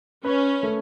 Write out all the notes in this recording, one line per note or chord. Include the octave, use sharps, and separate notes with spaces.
C#4 B4
A3